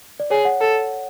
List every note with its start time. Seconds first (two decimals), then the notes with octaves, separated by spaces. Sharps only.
0.20 D5
0.30 G#4 C#5
0.45 F#5
0.61 A4